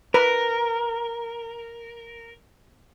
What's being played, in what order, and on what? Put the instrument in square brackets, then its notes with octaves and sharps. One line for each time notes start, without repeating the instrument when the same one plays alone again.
[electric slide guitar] A#4 [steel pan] B4